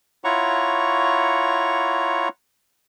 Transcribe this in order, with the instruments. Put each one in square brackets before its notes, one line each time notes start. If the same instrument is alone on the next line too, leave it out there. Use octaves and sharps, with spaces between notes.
[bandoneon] E4 F4 C#5 F#5 A#5 C#6